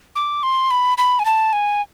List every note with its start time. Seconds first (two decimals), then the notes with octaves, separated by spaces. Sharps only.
0.16 D6
0.43 C6
0.71 B5
0.98 B5
1.19 G#5
1.25 A5
1.53 G#5